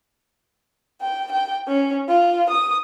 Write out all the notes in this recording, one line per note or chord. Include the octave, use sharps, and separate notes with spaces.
G5
G5
C#4
F4
D#6